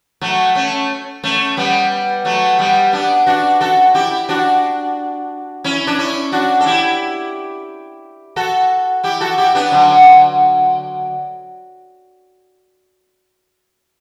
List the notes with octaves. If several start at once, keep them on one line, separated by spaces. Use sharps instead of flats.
F#3 A3
A3 C#4
A3 C#4
G3 B3
F#3 A3
G3 B3
B3 D4
D4 F#4
F#4 A4
E4 G4
D4 F#4
C#4 E4
D4
C#4 E4
D4 F#4
A4
E4 G4
F#4 A4
E4 G4
F#4 A4
E4 G4
B3 D4
D3 F#3